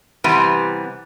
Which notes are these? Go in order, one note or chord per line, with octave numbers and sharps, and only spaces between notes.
C3 E3 G3 B3